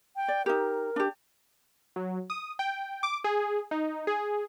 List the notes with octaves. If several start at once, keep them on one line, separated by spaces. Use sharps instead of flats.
G5
D5
D#4 G4 A#4
D4 G4
F#3
D#6
G5
D6
G#4
D#4
G#4